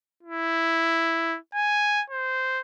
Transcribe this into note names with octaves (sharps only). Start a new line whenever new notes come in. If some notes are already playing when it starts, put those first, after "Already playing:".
E4
G#5
C5